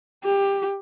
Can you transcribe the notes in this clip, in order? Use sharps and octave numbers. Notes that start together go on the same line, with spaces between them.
G4